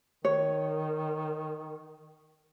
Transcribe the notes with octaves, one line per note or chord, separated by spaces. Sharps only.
D#3 C#5